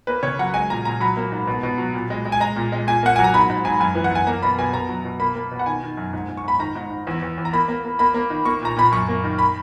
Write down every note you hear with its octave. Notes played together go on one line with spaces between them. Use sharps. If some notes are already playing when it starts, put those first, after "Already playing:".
A#3 B4
C#3 C#5
F#3 F#5
G#3 G#5
A#2 A#5
A#2 A#5
F#3 B5
A#3
G#2
B2
B2
F#3
A#2
G#3
G#3
G#5
G#3 A#5
A#2
G#3
A#2 G#5
A#3 F#5
F#3 G#5
A#5
G#2 B5
G#2
G#2 G#5
F#2 G#5
E3
F#5
F#2 G#5
A#3 A#5
B2 B5
B2 G#5
B2 A#5
F#3
B2
A#3 B5
A#3
B2
F#5
D#3 G#5
D#3
F#2
G#2
G#2
C#6
G#2 B5
D#3 A#5
G#2
G#2
E2
E2
E2
A#5
A#3 B5
A#3
A#3
A#3 B5
A#3
D#3
A#3 C#6
A#2 A#5
A#2 B5
F#2 C#6
A#3
D#3
B5